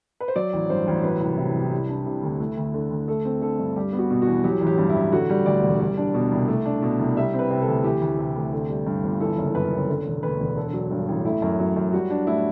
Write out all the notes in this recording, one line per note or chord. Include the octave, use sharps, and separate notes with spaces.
B4
C5
F#3 D5
A1
G2 C5
A1
F#3 B4
C2
C3
C2
G3
D4
C3
D2
A3
D2
D3
D2
A3 A4
C4
D3 A4
G2
G3 G4
B3
F#4
B2
E2 F#4
F#3 G4
A1
G4
G2
E4
A1
D3 F#4
G3
D2 D5
E1
G3
D4
B2
C2
A3
D4
B2
C2
G3 E5
C4 B4
C3
A4
D2
E3 G4
D2
C3
D2
D3
G3
G2
G1
E3 A4
F#1
F#2 B4
F#1
D3
E1
D2 B4
E1
D3 A4
F#3
G2
A1
A3 E4
F#2
F#3
F#2
G3 F#4
D4
A2 E4